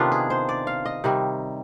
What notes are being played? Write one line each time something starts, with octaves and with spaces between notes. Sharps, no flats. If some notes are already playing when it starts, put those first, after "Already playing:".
Already playing: C3 D#3 B3 D4 F4
G#4
C5
D5
F5
D#5
C3 D#3 G3